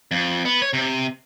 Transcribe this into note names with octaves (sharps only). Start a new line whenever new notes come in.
F2
B3
C#5
C3